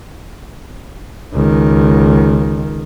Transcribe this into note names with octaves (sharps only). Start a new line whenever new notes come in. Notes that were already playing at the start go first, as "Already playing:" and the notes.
C#2 D#3